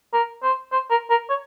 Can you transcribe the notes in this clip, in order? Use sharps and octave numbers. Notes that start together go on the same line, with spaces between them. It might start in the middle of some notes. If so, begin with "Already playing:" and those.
A#4
C5
C5
A#4
A#4
C#5